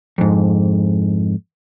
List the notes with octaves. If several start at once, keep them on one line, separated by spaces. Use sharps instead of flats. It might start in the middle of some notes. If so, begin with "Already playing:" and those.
F2 G#2